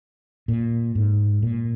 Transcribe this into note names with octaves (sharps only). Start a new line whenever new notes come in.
A#2
G#2
A#2